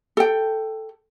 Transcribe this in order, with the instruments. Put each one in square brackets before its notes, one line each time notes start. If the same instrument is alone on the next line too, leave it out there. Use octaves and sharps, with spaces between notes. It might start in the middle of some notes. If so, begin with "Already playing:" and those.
[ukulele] A4 G5